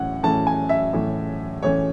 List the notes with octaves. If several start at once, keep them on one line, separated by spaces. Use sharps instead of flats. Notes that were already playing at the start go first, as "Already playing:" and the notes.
Already playing: A2 E3 C#4 F#5
A2 E3 A3 C#4 A5
G#5
E5
A2 E3 A3 C#4
A2 E3 A3 C#4 C#5